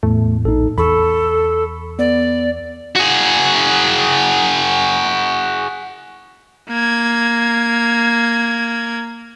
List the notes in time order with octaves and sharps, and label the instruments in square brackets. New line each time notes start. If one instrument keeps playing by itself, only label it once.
[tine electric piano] E2 A2 [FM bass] A3
[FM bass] A#1 [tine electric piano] D#4 A4
[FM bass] E2 [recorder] A4 [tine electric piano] B5 C#6
[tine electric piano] B3 [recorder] D5
[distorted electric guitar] F#4 G#4
[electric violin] A#3 G#6